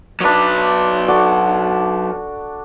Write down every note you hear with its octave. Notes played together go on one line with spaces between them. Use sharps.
F#3 D4 B4 D#6
F#4 A4 D5